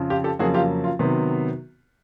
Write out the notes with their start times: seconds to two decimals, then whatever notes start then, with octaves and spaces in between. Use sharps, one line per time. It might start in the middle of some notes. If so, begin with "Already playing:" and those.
Already playing: F2 C#3 F3
0.10 F4 G4
0.24 G4 A4
0.39 F2 C#3 F#3 A#3 F#4 G#4
0.54 F4 G4
0.84 F4
0.99 C3 D#3 F#3 B3